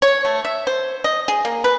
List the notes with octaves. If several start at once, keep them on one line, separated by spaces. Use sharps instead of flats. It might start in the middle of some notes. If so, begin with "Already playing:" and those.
C#5
A3
E5
C5
D#5
G#4
A#3
B4